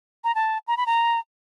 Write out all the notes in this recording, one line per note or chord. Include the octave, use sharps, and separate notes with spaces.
A#5
A5
A#5
B5
A#5